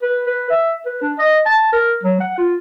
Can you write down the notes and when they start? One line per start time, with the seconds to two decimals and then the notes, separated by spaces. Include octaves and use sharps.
0.02 B4
0.26 B4
0.50 E5
0.86 B4
1.02 D4
1.18 D#5
1.45 A5
1.72 A#4
2.03 F#3
2.20 F#5
2.38 F4